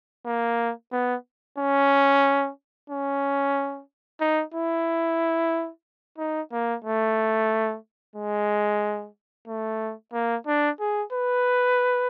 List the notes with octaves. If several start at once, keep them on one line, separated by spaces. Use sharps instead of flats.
A#3
B3
C#4
C#4
D#4
E4
D#4
A#3
A3
G#3
A3
A#3
D4
G#4
B4